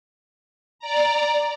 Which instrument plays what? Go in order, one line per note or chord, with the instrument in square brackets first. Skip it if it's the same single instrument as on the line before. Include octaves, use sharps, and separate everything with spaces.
[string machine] D5 A#5